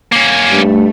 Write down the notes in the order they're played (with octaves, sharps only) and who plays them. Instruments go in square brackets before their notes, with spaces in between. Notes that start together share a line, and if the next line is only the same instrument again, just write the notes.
[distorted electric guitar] A#3 C#4
[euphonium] G2 [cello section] A3